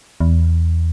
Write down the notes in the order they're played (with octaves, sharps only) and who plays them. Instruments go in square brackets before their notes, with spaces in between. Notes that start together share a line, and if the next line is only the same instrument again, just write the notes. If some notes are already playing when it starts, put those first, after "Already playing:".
[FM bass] E2